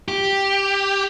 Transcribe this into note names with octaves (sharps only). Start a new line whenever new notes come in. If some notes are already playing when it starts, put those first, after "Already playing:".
G4